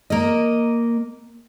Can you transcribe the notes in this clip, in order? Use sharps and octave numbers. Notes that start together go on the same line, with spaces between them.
A#3 A#4 D#5